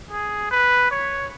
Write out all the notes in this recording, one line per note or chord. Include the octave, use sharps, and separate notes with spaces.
G#4
B4
C#5